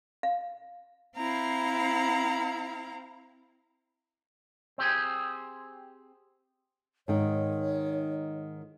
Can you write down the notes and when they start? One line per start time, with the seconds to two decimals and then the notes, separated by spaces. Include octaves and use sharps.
0.23 F5
1.17 C4 E4 F5 A#5
4.78 C4 G4 G#4
7.08 G#2 D#3 D#4 C#5